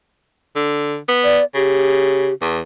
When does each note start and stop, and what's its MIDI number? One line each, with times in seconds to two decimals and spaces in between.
0.56 0.97 50
1.09 1.39 59
1.23 1.44 74
1.54 2.29 49
1.54 2.33 67
2.41 2.60 40